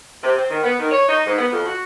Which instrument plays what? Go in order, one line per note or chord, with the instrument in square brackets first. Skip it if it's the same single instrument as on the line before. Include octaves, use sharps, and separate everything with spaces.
[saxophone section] C3
C4
D#3
B3
D#3
C#5
D#4
G#2
B3
F2
F#4